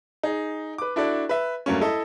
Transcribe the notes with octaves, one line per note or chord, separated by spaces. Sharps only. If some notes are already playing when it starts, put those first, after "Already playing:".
D#4 G#4
B4 D6
D4 E4 F#4 A4 D5
B4 E5
G2 F#3 A3 A#3 C#4
E4 A4 D#5 E5